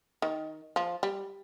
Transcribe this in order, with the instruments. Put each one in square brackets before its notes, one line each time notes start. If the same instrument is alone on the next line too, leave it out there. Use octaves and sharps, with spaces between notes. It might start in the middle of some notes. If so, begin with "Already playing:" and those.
[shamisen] D#3
F3
G3